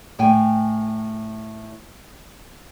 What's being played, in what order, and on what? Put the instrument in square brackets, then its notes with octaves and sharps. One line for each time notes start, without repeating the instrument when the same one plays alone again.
[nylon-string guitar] A2 G5 G#5